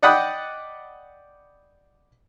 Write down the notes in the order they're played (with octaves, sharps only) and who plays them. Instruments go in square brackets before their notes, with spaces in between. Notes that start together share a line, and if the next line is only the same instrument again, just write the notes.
[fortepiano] D5 D#5 F#5 G5 B5 D#6